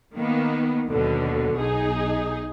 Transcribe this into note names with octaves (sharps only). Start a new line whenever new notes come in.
D#3 A#3 B3
D#2 B2 D3 F#3
B1 D#4 G#4